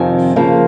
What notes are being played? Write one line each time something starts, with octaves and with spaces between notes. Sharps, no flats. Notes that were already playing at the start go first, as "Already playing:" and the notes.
Already playing: F2 C3 D#3 G#5
C#3 F3 A#3